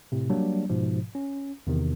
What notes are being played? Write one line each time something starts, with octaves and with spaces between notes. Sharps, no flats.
A2 C3
F#3 G3 A#3 D4
G#2 B2 F3
C#4
E2 C3 D#3